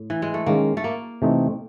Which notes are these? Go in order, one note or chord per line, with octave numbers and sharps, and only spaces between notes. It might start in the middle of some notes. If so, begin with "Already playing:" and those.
Already playing: A2
E3
G#3
A3
D#3 G#3 A#3 C#4
A3
A#3
C3 E3 A3 C4 D#4